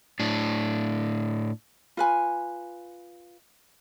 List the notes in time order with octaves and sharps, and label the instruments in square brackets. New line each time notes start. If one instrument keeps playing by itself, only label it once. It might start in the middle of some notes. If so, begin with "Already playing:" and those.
[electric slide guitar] A2 D4
[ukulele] F4 B4 G#5